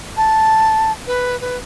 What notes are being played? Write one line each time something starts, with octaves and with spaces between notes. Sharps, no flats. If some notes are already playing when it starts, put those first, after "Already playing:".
A5
B4
B4